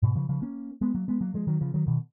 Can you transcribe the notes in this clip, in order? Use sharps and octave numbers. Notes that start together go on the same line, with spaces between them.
G#2 B2
C#3 F3
C#3 F3
A#3 C#4
G#3 B3
F#3 A#3
G#3 B3
F#3 A#3
F3 G#3
D#3 F#3
C#3 F3
D#3 F#3
B2 D#3